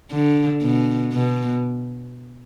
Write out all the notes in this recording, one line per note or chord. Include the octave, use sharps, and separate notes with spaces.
D3
B2
B2